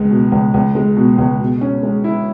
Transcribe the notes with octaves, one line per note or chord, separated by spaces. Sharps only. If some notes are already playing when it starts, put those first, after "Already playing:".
Already playing: C#2 G#3
B2
C#2
C#2
G#3
B2
C#2
B2
C#4
G#3
E4